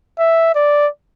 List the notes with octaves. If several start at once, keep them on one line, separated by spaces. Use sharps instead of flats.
E5
D5